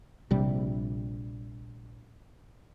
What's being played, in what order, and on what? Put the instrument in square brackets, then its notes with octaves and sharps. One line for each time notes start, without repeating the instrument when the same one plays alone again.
[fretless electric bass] A#1 C3 G3